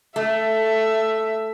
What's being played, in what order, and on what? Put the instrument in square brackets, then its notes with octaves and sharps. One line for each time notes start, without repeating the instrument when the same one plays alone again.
[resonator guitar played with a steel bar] A3 [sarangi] E5